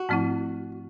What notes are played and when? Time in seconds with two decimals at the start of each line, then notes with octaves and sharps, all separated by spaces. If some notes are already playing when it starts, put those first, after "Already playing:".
Already playing: F#4
0.09 G#2 F3 A3 C4 E4